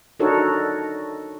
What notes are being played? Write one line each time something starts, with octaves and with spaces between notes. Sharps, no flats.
D4 D#4 F#4 A4 A#4 C#5